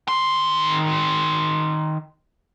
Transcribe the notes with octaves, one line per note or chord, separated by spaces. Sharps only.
D#3 C6